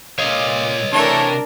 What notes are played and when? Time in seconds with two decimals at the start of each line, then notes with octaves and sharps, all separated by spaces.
0.19 A#2 C#5 D#5 F5
0.93 C3 E3 A3 D4 A#4 C#6